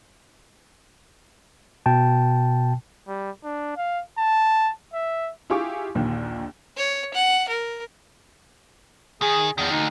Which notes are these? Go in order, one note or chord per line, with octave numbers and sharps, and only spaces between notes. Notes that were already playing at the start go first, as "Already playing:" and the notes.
B2 G5 A5
G3
D4
F5
A5
E5
E4 F4 G4 G#4 C#6 D6
A#1 D#2 A#2 D3 D#3
C#5
F#5
A#4
D#3 G#4
E2 D#3 F3
D2 D#4